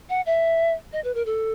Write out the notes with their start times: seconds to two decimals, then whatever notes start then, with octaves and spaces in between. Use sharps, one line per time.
0.10 F#5
0.26 E5
0.93 D#5
1.04 B4
1.15 A#4
1.26 A4